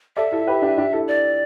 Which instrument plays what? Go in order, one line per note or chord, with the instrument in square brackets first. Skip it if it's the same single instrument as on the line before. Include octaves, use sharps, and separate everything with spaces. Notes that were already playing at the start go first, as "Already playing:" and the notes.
[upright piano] A4 D5 [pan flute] E5
[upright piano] E4 A4
G4 B4
D4 G4
D4 G4
E4 A4
[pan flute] D5